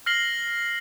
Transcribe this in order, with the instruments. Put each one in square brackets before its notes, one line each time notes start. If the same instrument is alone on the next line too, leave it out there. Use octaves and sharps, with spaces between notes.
[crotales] F6 A#6 C7 F#7 G7